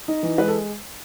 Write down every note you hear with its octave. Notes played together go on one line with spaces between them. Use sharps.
D#4
E3
G#3 B4
A4